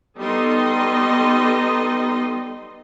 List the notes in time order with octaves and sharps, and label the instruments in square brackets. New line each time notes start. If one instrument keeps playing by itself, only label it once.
[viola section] G3 B3 D#4 A4 D#5 C6